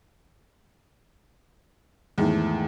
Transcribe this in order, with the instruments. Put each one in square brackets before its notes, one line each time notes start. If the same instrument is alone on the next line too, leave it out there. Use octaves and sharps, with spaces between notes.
[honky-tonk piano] E2 D#3 [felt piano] G#2 E3 A3